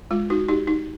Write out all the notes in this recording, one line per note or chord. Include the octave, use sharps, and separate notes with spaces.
G#3 F4
D#4 F#4
D#4 G4
D#4